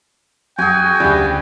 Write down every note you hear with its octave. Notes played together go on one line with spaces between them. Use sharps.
F#2 F#4 G#4 G5 G#5
D2 C#3 G3